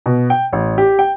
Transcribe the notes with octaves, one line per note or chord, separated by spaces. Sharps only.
B2
G5
A1
G4
G5